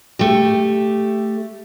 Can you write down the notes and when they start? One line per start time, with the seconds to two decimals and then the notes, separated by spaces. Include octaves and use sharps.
0.19 A3 G4